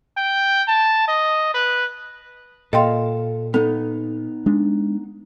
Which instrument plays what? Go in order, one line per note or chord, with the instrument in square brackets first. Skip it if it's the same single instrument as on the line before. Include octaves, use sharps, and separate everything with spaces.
[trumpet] G5
A5
D#5
B4
[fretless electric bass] A#2 [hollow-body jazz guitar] A4 F5 [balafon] D#5 G5 C6
[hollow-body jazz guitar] B3 D#4 [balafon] A4
[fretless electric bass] G#3 D4